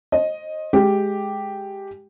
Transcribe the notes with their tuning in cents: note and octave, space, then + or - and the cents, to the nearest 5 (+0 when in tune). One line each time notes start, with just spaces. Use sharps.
C5 +35 D#5 +0
G#3 +10 G4 +0